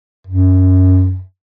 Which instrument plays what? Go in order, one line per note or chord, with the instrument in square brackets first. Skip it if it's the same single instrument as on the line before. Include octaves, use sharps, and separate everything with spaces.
[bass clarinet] F#2